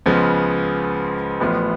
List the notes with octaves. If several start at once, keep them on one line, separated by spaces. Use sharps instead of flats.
C#2 C#3 F3 B3
A1 A2 F3 B3